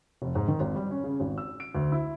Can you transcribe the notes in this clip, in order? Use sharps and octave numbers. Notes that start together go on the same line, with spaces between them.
F1
G#2
D#3
G#1
G3
C#4
C#3
G#1
E6
D7
D2
E4